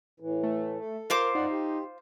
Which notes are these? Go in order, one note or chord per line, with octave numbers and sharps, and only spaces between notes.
A2 E3
A3
A4
F4 A#4 C5 D6
F#2 D#4 D5 F#5
G4